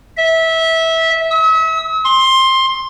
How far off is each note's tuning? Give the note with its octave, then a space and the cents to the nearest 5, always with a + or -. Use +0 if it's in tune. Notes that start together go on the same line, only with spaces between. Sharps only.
E5 -20
E6 -45
C6 +15